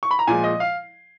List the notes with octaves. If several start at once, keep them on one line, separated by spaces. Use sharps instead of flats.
C#6
B5
A#5
A#2 F3 G#3 G#5
D#5
F5